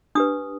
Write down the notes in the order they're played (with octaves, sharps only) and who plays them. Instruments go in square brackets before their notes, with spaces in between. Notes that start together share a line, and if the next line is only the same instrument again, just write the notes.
[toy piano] D4 G4 B4 D#6